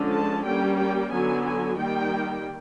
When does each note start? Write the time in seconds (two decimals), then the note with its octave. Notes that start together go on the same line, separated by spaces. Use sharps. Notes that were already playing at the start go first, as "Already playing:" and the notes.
Already playing: D3 F3 G#3 C#4
0.12 A5
0.45 G3 A#3 C#4 G5
0.78 G5
1.11 D3 F#3 B3 G#5
1.45 G#5
1.78 D#3 G3 A#3 G5